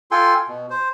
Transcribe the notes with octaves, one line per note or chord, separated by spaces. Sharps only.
F4 A4 G5 G#5 C6
B2
C5